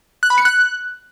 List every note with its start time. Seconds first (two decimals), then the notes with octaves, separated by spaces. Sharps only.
0.23 F#6
0.30 B5
0.38 C#7
0.45 F#6